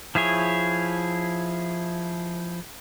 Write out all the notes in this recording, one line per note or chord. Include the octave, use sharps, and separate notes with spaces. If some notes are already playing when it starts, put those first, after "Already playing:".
F3 E4 G#4 C#5